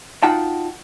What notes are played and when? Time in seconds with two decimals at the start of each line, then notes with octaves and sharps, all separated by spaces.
0.23 D#4 F4 F#4 F#5 G5 A5